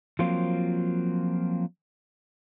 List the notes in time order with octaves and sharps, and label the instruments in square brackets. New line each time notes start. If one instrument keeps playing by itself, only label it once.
[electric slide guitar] F3 F#3 A#3 C4 F4